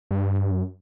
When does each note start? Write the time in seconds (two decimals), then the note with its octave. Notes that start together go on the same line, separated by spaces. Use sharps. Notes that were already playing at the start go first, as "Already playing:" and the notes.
0.11 G2
0.51 F#2